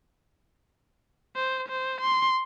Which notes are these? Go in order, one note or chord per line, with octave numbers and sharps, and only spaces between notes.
C5
C5
C6